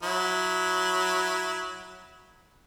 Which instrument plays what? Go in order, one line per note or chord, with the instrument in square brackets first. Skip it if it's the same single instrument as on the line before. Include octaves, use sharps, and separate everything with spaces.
[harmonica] F#3 E4